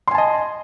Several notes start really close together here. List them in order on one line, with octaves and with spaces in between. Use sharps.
C6 G#5 A5 D#5